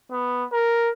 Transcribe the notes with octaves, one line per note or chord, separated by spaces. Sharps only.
B3
A#4